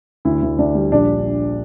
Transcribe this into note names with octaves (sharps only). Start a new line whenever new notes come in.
D2 E4
D2
D2 D4
G3
A#1 D4